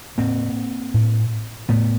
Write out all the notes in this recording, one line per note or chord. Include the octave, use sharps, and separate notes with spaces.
A2 A#3 C4
A2
A2 A3 B3